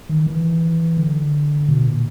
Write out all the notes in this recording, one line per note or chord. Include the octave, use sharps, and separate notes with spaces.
D#3
E3
D3
B2
A#2